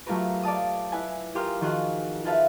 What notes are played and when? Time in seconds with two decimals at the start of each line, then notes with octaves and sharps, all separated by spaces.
0.06 F#3 A3 F4 G4 A#4 B4
0.43 D5 F5 A5 D#6
0.92 E4 B4 G#5
1.35 F4 G4 A#4 C6 D#6 F6
1.61 D#3 F3 F4 F#4 G#4
2.25 F4 G#4 A4 B4 E5 F5